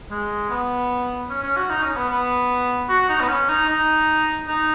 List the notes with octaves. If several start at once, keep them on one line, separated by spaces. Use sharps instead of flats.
G#3
B3
C#4
C#4
F#4
D#4
C#4
B3
B3
F#4
D#4
B3
C#4
D#4
D#4
D#4